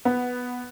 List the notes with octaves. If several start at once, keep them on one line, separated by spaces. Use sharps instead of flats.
B3